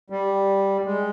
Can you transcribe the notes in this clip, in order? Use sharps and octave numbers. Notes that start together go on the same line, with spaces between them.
G3
G#3